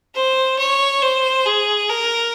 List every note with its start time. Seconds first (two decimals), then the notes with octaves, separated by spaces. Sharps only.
0.15 C5
0.59 C#5
1.02 C5
1.46 G#4
1.90 A#4